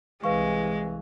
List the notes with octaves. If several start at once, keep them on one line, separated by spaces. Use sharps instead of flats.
C2 E3 G#3 B4 F5 C#6